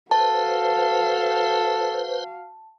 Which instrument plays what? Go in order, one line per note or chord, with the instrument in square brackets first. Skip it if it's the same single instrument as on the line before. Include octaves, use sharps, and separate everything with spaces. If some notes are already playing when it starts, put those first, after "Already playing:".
[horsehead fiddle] F#4 F5 [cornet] A4 [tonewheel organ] B4 C5 [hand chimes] A5